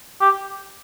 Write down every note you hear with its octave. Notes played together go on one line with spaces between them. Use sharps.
G4